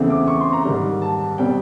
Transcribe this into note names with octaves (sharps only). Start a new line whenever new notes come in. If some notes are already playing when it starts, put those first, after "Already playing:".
Already playing: E2 C#3 E3 A3 C4
D6
C#6
C6
A#5
G#2 D#3 G3
A5
B2 G3 C4 G5